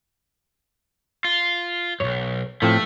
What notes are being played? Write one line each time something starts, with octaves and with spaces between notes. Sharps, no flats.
F4
B1 F#2 C#5
A2 F3 A3 C4